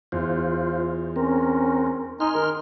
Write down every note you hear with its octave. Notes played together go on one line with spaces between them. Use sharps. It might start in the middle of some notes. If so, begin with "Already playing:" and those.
E2 F4 C5
C4 C#4 A#4
D#4 G#5 C6 F6
D#3 A#4